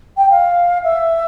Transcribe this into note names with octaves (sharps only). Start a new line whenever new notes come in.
G5
F5
E5